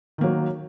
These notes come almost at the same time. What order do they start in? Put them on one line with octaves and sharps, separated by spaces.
D#3 A#3 F#3